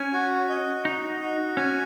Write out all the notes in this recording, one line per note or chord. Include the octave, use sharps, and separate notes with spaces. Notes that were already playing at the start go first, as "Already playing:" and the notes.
Already playing: C#4 G#5
F#4
D#5
D#4 F#4
F#4
C#4 G#5